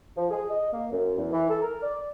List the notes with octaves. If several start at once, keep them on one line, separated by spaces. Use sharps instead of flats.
F3
G#4
D#5
A#3
F#2
E2
E3
A4
A#4
D5